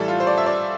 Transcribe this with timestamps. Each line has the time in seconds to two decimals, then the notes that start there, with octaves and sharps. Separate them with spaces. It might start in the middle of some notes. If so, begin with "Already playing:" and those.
Already playing: A2 E3 G3 A4
0.08 F4
0.20 C5
0.27 D5
0.38 E5
0.46 D5